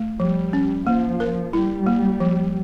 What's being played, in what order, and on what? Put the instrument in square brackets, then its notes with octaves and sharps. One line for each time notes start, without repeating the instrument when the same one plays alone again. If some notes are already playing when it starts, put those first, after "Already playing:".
Already playing: [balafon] A3
[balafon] F3 [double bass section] G3
[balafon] C#4
[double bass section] F3 [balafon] A#3
[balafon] A#4
[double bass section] G3 [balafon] E4
[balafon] A#3
F3